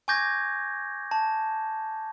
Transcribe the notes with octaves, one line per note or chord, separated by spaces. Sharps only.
G#5 C#6 D6 G6 G#6 A#6
A5